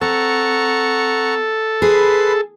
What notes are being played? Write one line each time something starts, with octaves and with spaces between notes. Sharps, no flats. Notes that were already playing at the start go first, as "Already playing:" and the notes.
C4 A4 F#5 A#5 C#6
G#4 B4 B5 C6